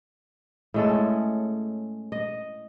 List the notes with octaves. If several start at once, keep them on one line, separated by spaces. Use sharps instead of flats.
A2 G#3 A4
C#4
D#5